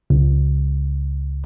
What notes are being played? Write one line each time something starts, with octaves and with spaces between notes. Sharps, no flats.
C#2